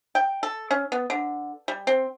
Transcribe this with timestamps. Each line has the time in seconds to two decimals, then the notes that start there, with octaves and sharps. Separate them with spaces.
0.15 G5
0.43 A4
0.71 C#4
0.92 B3
1.10 D3
1.68 G3
1.87 C4